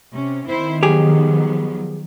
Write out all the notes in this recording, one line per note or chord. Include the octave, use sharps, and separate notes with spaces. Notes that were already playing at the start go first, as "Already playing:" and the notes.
C3 C#4
D#3 C4 E4 C5
F3 F#3 B3 G4 G#4